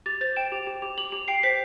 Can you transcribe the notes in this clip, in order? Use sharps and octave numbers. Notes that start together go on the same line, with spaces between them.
G4 A6
C5 A6
G5 E7
G4
G4
G4
G4 F#7
G4
G5 C7
C5 B6